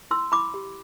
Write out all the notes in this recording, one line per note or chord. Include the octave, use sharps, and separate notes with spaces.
E4 C6 E6
E4 B5 D6
G4